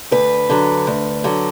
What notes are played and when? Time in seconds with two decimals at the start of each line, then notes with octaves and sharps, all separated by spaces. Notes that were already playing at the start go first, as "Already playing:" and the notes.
0.11 D2 B4
0.50 D3 F#3
0.87 D2
1.24 D3 F#3